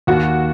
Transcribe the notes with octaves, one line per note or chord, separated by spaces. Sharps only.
D#2 F#4